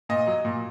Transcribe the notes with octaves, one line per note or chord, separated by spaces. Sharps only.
A#2 D#5
F#3
A#2